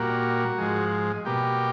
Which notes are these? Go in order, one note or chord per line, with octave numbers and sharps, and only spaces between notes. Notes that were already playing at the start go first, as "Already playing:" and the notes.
Already playing: A#2 G3 A#3 F#4
G#2 F3 G#3
B2 G3 A#3 G4